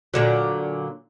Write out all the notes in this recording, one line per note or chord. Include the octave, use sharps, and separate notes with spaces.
A#2 D3 F#3